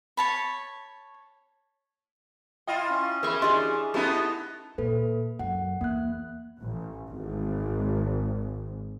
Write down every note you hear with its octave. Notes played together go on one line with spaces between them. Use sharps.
C#5 A5 B5
E4 F4 D#5 G5
C#4
E3 G#4 A#4 B5 C#6
D4 G4 G#4 D#5 C6
A3 B3 C#4 D#4 E4 G4 A5
A#2 A#3 A4 B4
F#2 F#5
E2 A#3 F#6
A1
G#1